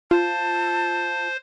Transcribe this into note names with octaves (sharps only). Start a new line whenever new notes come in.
F4 C5 A5